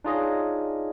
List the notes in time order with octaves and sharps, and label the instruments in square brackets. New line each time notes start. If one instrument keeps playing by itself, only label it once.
[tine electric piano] D4 D#4 F4 G#4 C#5 D#5